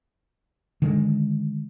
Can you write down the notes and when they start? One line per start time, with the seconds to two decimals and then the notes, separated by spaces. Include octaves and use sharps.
0.82 D3 D#3 G#3